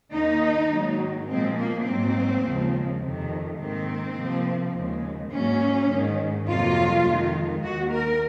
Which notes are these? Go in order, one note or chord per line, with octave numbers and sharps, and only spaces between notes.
D#2 D#3 A#3 D#4
G#2 D#3 F#3 A#3
A#2 F3 G#3 C4
A#3
G#2 F#3 A#3 C4
D#2 C#3 F3 G#3
F2 C3 D#3
G#2 D#3 A#3 C4
C3 F3 A#3
D#2 C#3 G#3
G#2 F#3 A#3 C#4
G#2 D#3 G#3
F2 C3 F#3 A#3 F4
F2 D#3 G#3
D#2 D#3 A#3 F#4
A#4